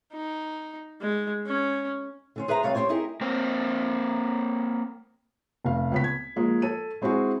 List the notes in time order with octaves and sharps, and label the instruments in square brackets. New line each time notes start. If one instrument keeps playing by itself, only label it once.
[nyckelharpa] D#4
G#3
C#4
[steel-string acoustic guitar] D3 C#4 C5
G#4 B4 C5 E5 F5 A#5
C3 G3 C#5 D5 F5
C#4 E4 G4 C5 C#5
D#4 E4 G4 G#4 A#4
[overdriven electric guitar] A#3 C4
[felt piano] F1 F5
C#2 B3 B6
G#6
F3 G#3 A#3
A4 D#7
G#3 C4 E4 F#4 G#4